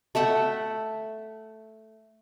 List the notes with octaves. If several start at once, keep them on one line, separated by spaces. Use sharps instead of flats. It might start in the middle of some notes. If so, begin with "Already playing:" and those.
A3 E5 F#5 G5